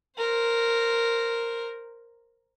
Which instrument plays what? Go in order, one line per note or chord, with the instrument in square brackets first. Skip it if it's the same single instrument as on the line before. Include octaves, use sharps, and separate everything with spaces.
[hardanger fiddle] A#4 C5